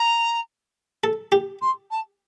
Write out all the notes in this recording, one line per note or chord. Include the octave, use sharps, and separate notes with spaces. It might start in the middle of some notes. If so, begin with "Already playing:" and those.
Already playing: A#5
A4
G4
C6
A5